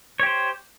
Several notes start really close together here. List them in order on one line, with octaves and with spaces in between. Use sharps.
C#5 G4 C5